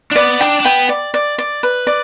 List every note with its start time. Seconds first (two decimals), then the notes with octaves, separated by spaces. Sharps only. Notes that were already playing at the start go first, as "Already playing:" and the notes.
0.11 D4
0.16 B3 D5
0.40 D4 G5
0.60 D4
0.65 B3 G5
0.89 D5
1.14 D5
1.38 D5
1.63 B4
1.87 D5